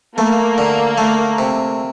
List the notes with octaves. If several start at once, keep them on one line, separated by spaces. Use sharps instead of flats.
A3 A#3
D3
A3
C3